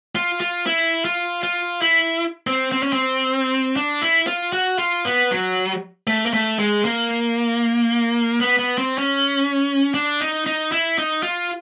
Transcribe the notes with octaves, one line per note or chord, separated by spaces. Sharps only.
F4
F4
E4
F4
F4
E4
C4
C4
C#4
C4
D4
E4
F4
F#4
F4
B3
F#3
A3
A#3
A3
G#3
A#3
B3
B3
C4
C#4
D4
D#4
D#4
E4
D#4
F4